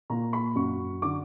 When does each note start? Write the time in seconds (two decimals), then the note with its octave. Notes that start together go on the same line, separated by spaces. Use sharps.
0.10 A#2 A#5
0.33 B5
0.55 F#2 C#6
1.02 D3 D6